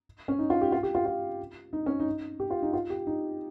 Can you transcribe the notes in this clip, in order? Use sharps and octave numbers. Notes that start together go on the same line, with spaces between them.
C#4
D#4
F4
G4
F4
G4
F4
F4
D#4
C#4
D#4
G4
F4
D#4
F4
G4
D#4